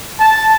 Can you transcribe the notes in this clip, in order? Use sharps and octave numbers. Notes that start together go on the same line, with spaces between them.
A5